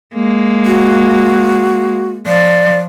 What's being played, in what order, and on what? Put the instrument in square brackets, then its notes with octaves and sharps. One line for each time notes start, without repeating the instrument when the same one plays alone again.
[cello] G#3 A#3
[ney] F#4
[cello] F3 [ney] D5